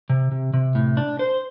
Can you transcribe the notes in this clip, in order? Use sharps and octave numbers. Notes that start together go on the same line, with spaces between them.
C3
C3
C3
A2
D4
C5